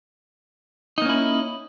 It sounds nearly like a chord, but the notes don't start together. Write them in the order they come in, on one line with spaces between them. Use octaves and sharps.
D#4 A#3 C#4 E4